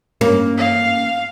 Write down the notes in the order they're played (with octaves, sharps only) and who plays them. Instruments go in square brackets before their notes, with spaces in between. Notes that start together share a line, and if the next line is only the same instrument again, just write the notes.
[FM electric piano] G2 C#4 [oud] A#3
[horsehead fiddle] F5